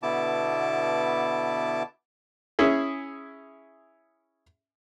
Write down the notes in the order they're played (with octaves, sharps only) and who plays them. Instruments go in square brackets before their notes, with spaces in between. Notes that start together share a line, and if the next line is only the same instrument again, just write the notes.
[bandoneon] B2 D3 B3 E4 A5 D6
[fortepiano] C#4 E4 G#4